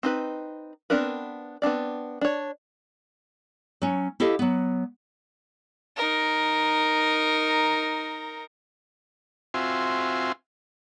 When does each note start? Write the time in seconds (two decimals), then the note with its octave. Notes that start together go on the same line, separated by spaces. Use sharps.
0.03 C4 D#4 B4
0.90 B3 C4 D4 A#4 B4
1.62 B3 C4 D4 D5
2.21 D4 C#5
3.82 F#3 C#4
4.20 E4 G4 A4 D#5 F5
4.39 F#3 B3
5.97 D#4 A#4
9.54 C4 F4 F#4 E5 G#5 C6